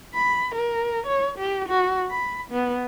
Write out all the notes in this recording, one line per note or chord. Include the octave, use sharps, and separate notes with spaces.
B5
A#4
C#5
G4
F#4
B5
B3